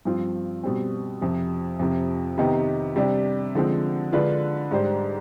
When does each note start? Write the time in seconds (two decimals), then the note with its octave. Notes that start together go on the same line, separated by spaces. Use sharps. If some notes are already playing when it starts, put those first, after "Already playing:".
0.05 G2 F3 C4 F4
0.64 B2 G3 C4
1.21 F2 C3 F3
1.79 F2 C3 F3
2.38 C3 D#3 B3 D#4 G4
2.96 C3 G3 D4 G4
3.55 D3 F3 G#3 C4
4.12 D3 G#3 D4 F4 B4
4.71 G#2 G3 D4 G4 C5